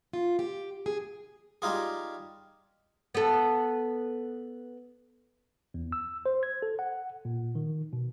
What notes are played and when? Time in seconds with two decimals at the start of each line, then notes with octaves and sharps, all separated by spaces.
0.13 F4
0.39 G4
0.86 G#4
1.62 G3 D#4 F4 G#4
3.15 B3 A4
5.74 E2
5.92 E6
6.26 C5
6.43 G#6
6.62 A4
6.79 F#5
7.25 A#2
7.55 D#3
7.93 B2